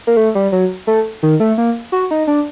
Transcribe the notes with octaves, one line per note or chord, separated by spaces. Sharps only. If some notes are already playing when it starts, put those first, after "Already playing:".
A#3
A3
G3
F#3
A3
D#3
A3
A#3
F#4
D#4
D4